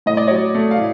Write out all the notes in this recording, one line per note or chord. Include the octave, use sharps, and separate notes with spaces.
A2 D#5
D5
F#3 C#5 D#5
A3
F5
A2